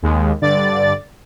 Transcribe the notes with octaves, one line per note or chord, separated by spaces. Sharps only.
D#2 G#3
G2 D3 D5 A6